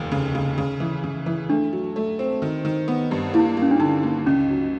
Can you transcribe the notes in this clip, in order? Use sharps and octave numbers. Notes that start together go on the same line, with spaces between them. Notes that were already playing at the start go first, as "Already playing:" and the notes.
Already playing: F1 D#2
C#3
C#3
C#3
E3
C#3
E3
A3 D4
F#3
A3
C4
D#3
D#3
B3
G2
A#3 E4
A#3
C#4
D4
D3 D#4
A#3
C#2 C#4
F#3